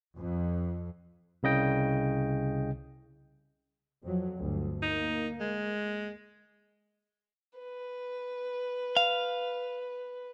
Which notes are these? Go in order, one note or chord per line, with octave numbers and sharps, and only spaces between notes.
F2
C2 C#3 D#5 G5
F2 F3 F#3
G1 D2
A#3 D#4
G#3
B4
F5